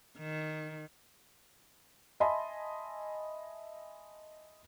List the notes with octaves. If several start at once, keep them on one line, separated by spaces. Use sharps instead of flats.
D#3
D#5 E5 G#5 A5 B5 C6